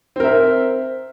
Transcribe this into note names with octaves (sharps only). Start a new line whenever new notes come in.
C4 A#4 E5